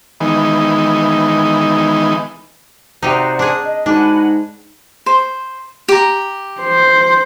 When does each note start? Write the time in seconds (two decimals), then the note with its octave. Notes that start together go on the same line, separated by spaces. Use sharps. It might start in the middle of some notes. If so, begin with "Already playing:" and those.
0.20 D#3 E3 G#3 B3 D#4
3.02 C3 D#4 F#4 C5 D5
3.39 D4 G#4
3.64 D#5
3.86 G#2 D4 F#4 G#5 B5
5.06 C5
5.88 G4 A#5
6.61 C5